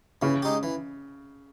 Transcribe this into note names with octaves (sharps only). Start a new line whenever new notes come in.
C#3 E3
G#3 D#4 G4
E3